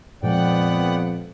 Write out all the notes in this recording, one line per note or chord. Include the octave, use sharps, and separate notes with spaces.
F2 A#2 F3 G#3 B3 D5 F#5 G5